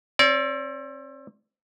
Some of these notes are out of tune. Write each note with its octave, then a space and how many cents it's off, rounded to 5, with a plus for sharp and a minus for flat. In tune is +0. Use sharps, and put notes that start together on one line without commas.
C4 +35 D5 -30